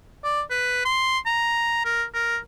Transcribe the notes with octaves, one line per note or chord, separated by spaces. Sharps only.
D5
B4
C6
A#5
A#4
A#4